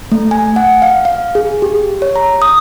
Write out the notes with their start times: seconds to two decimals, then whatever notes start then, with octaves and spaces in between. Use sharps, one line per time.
0.12 A3
0.31 G#5
0.56 F#5
0.82 F5
1.05 F5
1.35 G#4
1.62 G4
2.02 C#5
2.16 A#5
2.42 D#6